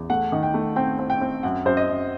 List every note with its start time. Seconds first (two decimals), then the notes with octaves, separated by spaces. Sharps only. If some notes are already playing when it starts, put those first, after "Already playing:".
Already playing: E2
0.10 A3 F#5
0.32 D#3
0.43 G5
0.54 A3
0.76 C4 G5
0.99 C4
1.10 G5
1.21 C4
1.43 F#2 F#5
1.65 F#2 C5
1.77 D#5
1.88 F#2